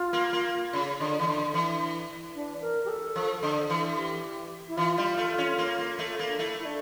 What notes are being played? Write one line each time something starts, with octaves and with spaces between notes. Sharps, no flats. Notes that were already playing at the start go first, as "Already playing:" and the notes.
Already playing: F4
A#3
A#3
C#3
D3
E3
D3
D4
E3 E4
D4
A#4
G4
A4
F3
D3
E3
G4
E4
E3 F4
G3
A3
C#4
A#3
A#3
A3
A#3
D4
A3 E4
E4
D4